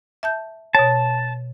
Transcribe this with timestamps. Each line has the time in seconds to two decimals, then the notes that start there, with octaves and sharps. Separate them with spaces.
0.23 E5 A5 G6
0.75 B2 C#5 A5